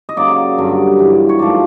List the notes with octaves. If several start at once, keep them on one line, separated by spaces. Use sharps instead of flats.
D#5
C#3 F#3 A#3 D5
G2 D3 F#3
G2 E3 G3
C#5
G#2 F3 A3 D5